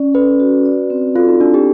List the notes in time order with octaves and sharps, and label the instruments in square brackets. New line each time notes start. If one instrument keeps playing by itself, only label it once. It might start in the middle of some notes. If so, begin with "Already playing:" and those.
Already playing: [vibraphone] C#4 D5
[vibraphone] A4 [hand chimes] B4
[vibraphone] F#4
D5
C4
[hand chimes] F4 [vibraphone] A4
[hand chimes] D#4
[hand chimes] D4 [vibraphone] E4
[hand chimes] G4